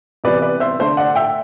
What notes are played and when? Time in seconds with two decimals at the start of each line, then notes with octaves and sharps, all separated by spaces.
0.24 C3 E3 G3 B3 B4 D5
0.42 B4 D5
0.60 C5 E5
0.79 D3 A3 D4 C5
0.97 D5 F#5
1.15 E5 G5